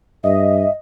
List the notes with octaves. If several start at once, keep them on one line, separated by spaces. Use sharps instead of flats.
G2 D#5 E5